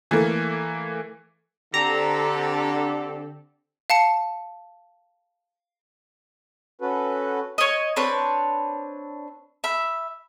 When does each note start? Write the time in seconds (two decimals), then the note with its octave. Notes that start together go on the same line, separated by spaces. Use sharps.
0.11 E3 A3 A#3
1.74 D3 C4 G4 A4 A#5
3.90 F5 A5 C#7
6.81 C#4 F#4 A4 B4
7.58 C#5 D#5
7.96 C4 D4 B4 C#5
9.64 E5 B5